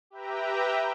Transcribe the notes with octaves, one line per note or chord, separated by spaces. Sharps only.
G4 B4 E5 G5 A#5